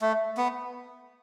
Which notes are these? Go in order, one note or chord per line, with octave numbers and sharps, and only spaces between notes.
A3
B3